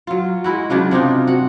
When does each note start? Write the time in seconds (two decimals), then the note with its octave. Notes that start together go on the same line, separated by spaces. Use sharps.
0.07 F#3 F4
0.44 G#3 E4 F#4
0.70 C#3 F#3 D4 F4
0.91 C3 D4 D#4 F4
1.27 F#4 F#5